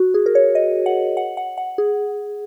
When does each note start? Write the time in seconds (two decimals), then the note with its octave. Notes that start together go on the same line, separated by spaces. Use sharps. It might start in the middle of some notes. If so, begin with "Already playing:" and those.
Already playing: F#4
0.14 G#4
0.26 A#4
0.35 C#5
0.55 D#5
0.86 F#5
1.17 F#5
1.37 F#5
1.58 F#5
1.78 G#4